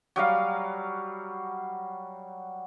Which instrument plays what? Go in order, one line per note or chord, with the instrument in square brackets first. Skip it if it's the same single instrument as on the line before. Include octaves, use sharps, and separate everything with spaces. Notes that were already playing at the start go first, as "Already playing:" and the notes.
[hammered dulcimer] F#3 G3 F5